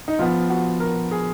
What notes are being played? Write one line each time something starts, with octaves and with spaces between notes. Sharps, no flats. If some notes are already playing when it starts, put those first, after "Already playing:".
D#4
F3 B3 F4
F#4
A#4
G#4